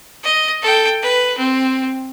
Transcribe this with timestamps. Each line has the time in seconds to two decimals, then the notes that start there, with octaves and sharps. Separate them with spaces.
0.24 D#5
0.62 A4 G5
1.02 B4
1.38 C4